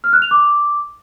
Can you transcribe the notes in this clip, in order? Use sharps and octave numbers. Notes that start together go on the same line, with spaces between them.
F6
F#6
F7
D6